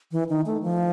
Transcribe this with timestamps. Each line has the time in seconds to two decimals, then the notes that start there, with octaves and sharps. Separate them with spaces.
0.12 E3
0.29 D#3
0.46 A3
0.62 F3